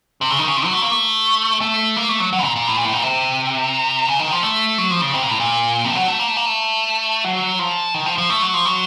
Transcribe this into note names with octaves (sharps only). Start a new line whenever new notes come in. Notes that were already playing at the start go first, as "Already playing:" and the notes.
C3
C#3
D#3
C#3
C3
F#3
A3
A#3
A3
A3
A#3
A3
F#3
F#3
A#2
A#2
A2
A#2
A2
A#2
C3
C#3
D#3
F3
A3
F#3
F3
C#3
C3
A#2
A2
A#2
C3
F3
F#3
A3
A#3
A3
A#3
A3
F#3
F3
D#3
F3
F3
A3
F#3
F3
F#3